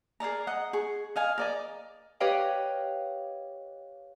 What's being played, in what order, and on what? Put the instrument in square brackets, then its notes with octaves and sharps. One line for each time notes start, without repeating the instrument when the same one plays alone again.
[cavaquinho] G#4 A#4 D5 A#5
D#5 F#5
G#4 C#6
D#5 F5 G#5
A#4 D5 D#5
[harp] G4 B4 C#5 D#5 F5 G5